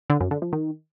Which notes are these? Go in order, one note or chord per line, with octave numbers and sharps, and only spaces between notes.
D3
F#2
D3
F3
D#3